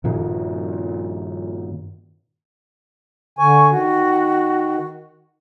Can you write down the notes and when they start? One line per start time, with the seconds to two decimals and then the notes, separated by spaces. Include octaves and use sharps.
0.04 G2 A#2 D#3
3.39 D3 G#5 C#6
3.71 D#3 F#4